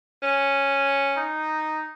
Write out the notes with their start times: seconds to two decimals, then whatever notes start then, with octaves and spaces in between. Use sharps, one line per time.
0.22 C#4
1.17 D#4